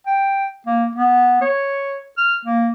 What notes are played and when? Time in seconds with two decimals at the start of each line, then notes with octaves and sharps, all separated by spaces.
0.06 G5
0.67 A#3
0.95 B3
1.41 C#5
2.18 F6
2.45 A#3